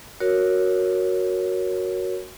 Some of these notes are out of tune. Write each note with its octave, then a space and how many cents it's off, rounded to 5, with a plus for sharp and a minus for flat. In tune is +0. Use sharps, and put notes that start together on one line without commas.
F#4 +0 A#4 +5 C#5 +0